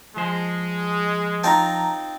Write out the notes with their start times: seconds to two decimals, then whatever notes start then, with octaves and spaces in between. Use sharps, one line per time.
0.17 F3 G#3 C5
1.44 C4 D#4 F4 A5 A#5